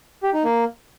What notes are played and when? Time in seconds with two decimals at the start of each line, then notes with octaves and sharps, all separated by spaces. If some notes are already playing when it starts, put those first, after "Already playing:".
0.23 G4
0.34 D#4
0.44 A#3